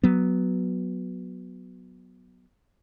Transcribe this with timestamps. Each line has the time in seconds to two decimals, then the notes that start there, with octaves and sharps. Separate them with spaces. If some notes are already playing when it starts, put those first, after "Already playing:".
0.03 F#3 B3